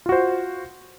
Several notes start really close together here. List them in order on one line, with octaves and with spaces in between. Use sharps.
F4 F#4 C5